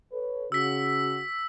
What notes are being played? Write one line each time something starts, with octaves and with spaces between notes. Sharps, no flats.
A4 B4 C#5
C#3 F#4 E6 B6